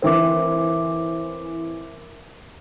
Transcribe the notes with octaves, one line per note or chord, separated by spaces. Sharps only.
E3 C4 A#4 E5 D6